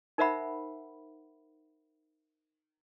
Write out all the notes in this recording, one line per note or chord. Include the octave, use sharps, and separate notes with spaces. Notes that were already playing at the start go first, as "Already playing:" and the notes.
D#4 A#4 C5 E5 F#5 B5